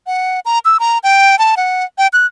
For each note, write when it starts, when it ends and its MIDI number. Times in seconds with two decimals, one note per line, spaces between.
0.07 0.40 78
0.45 0.59 82
0.65 0.78 88
0.80 0.98 82
1.03 1.38 79
1.39 1.55 81
1.57 1.84 78
1.98 2.08 79
2.13 2.26 90